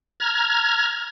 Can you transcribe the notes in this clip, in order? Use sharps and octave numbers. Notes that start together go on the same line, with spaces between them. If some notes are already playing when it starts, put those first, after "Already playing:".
A#5 F6 G#6